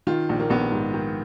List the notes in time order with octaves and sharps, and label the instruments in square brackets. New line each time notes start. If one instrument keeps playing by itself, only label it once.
[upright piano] D#3 F4
A#1
A#3
A#1 B3
G#2
D#3